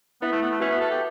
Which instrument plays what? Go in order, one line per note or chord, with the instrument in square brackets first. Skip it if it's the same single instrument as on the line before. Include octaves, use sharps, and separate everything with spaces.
[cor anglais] B3 [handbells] E4 B4 E5
[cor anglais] A3
B3
A3
[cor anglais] C#4 [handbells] F#4 B4 E5
[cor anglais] B3
A4
G4